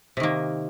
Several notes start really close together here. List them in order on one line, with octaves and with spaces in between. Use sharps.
C3 D#3 A#3